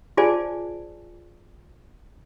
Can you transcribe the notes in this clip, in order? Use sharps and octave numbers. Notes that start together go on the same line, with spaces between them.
F4 G#4 C5 D5 G#5 A5